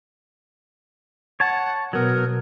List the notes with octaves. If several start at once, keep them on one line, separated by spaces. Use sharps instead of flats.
C#5 F#5 A5
B2 F#3 B3 A#4